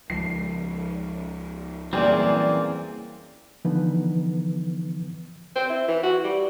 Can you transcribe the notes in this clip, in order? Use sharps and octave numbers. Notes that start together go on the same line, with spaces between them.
C#2 F3 G#3 C7
A#2 E3 F#3 G3 C4 C#4 G#4 D5
D3 E3 F3 B3 D#4 B4
C4
E4
E3
F#4
G3